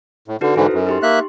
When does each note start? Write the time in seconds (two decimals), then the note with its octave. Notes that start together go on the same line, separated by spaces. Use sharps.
0.28 A2
0.41 D3 D#4 F#4 B4
0.56 G#2 D3 E3 E4 A4 C5
0.73 F#2
0.87 D#4 G4 C6
1.03 A#3 E5 F#6